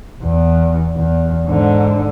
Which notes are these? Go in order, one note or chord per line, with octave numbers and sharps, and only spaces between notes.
E2
E2
G#2 D3